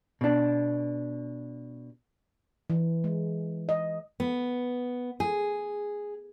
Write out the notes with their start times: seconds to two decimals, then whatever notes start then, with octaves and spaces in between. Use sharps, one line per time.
0.21 B2 D4
2.70 E3
3.04 G#3
3.69 D#5
4.20 B3
5.20 G#4